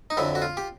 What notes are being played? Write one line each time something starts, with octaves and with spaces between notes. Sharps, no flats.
D#4
F2 D3 F#3 E4
F#4
F4
G4